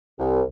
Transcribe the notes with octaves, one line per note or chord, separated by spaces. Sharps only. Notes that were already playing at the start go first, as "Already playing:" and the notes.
C2